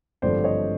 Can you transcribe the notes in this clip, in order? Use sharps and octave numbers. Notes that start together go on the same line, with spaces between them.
G#1 G2 D3 F3 A3 C5 D5
C#5 D#5